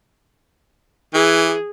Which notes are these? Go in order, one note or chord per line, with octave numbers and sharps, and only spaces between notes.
E3 G#4